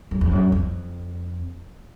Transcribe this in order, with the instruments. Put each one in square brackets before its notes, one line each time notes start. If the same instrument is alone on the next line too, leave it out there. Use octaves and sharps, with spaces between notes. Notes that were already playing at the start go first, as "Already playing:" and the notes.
[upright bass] F#2
F2
F#2
F2